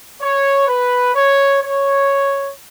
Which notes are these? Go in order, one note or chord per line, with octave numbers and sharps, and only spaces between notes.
C#5
B4
C#5
C#5